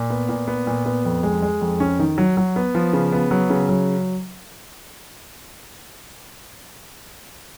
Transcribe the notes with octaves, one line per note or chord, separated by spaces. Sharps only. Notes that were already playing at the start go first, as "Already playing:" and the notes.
Already playing: A#2
B3
A#2
B3
A#2
B3
F2
G#3
G#3
F2
C#4
D#3
F#3
F#3
B3
F3
C#3
B3
F#3
C#3
F#3